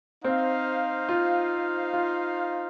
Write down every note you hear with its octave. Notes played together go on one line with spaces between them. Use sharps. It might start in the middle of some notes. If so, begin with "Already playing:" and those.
C4 D#4 C5 F5
F4
F4